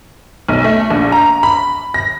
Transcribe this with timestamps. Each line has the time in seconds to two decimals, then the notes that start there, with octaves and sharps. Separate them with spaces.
0.48 B1
0.64 A3
0.90 A#1
1.12 A#5
1.43 B5
1.94 A#6